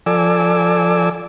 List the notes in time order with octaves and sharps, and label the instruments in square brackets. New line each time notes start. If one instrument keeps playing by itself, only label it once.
[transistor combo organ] F3 A4 D5 G#5 D6 E6